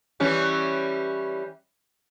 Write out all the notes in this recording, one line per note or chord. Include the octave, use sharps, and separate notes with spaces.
E3 G3 C#4